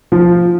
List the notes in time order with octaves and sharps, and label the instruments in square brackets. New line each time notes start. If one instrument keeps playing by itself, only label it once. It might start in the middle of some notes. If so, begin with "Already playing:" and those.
[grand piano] F3